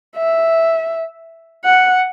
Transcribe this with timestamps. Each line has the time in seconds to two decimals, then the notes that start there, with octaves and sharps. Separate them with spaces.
0.16 E5
1.65 F#5